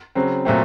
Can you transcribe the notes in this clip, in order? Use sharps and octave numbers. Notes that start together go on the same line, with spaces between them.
C#3 F#3 C4
A#2 F#3 A3 C4